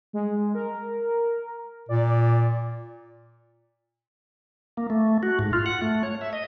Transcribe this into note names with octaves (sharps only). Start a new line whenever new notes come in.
G#3
A#4
A#2 D5
A#3
A3
F#4
G#2
F4
F#5
A3
C#5
E5
D#5